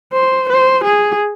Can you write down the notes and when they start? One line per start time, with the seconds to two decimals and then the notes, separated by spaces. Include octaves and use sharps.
0.13 C5
0.49 C5
0.84 G#4